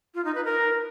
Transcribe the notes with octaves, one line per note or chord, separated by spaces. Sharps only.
F4
D#4
B4
A#4